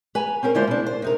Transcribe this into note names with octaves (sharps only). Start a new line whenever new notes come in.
B4 G#5 A#5
C4 C#4 A#4 C5
D3 G#3 A#3 E4 F4 C5
B2 D4
C5
C3 D#4 A#4